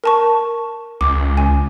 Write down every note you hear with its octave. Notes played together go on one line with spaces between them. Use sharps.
A#4 A5 C#6
C#2 D6
G#5